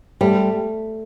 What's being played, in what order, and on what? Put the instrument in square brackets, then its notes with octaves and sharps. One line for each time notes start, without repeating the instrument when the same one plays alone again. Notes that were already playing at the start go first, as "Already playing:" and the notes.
[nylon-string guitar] G3 [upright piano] A3